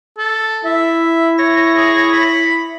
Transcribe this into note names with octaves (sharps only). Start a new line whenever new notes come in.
A4
E4 E5
C#5 A#6
G#4
B5